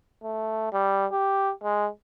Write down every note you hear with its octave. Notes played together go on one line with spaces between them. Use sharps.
A3
G3
G4
G#3